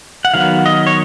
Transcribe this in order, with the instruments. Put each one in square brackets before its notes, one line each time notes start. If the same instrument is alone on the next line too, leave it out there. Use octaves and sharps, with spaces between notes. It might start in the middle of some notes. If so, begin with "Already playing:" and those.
[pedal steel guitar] F#5
D#3 F#3 B3 F5
D#5
C#5